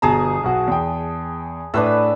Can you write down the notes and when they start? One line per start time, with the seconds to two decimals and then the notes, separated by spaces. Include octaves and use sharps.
0.02 G1 B2 G#4 A5 A#5 D#6
0.44 B1 B2 F#4
0.67 E2 G5
1.74 A2 D4 B4 E5